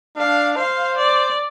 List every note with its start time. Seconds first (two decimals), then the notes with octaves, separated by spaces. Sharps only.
0.17 D4 F5
0.57 C5 F5
0.97 D5